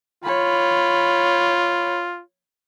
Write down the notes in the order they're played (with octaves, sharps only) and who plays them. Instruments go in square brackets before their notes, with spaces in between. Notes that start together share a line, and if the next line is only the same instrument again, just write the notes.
[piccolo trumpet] F4 [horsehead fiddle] C#5 B5